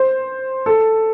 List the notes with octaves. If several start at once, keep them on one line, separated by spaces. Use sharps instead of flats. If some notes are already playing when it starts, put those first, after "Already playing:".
Already playing: C5
A4